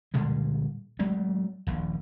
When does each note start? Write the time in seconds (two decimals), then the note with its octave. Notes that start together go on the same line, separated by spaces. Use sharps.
0.14 A#2 D3 G3 G#3
0.99 F#3 G#3 A3 C4
1.67 D#1 A#1